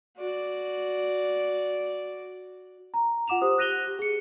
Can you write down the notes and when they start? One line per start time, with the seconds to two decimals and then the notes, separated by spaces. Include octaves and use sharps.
0.17 F#4 D5
2.94 A#5
3.28 F4 F#5 D6 E7 F7
3.41 G4 C5 D#6
3.58 F#6 A#6 D#7 F7 G7
3.87 G4
3.99 G#4 C#7